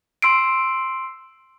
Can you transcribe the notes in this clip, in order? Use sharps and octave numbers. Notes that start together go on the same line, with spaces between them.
C6 E6 C7 D7